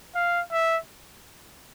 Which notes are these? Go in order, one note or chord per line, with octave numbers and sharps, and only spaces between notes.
F5
E5